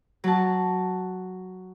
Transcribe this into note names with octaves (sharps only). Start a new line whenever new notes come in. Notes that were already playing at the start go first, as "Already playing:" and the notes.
F#3 A5